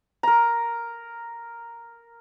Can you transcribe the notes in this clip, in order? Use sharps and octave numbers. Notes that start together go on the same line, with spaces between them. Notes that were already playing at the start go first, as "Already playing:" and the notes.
A#4 A#5